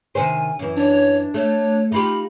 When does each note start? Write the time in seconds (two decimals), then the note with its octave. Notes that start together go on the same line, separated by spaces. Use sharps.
0.15 C3 D#3 C5 G#5
0.59 F#2 E3
0.76 D4 C#5
1.34 A3 C#5
1.92 D#4 F4 G4 B5